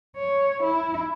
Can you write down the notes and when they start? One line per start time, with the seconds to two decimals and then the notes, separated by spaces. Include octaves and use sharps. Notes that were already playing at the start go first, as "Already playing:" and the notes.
0.17 C#5
0.63 E4